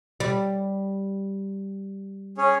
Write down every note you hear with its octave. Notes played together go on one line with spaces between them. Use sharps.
G3
C#4 G#4 C#5